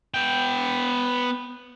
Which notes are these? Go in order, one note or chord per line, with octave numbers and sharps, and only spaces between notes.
B3 G5